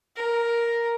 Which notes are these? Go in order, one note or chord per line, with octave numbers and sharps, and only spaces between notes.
A#4